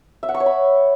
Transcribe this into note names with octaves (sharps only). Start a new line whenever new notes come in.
E5
F#5
C#6
C#5
B5